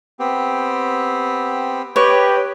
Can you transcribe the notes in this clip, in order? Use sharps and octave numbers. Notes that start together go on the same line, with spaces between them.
B3 C4 G4
G4 B4 C#5 D#5